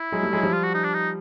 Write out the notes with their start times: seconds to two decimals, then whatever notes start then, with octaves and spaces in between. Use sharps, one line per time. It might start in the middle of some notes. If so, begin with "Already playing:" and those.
Already playing: E4
0.12 F#3 G#3
0.23 G3 A3
0.33 F#3 G#3
0.43 F3 G3
0.53 F4
0.63 F#4
0.74 D#4
0.84 D4
0.94 D#4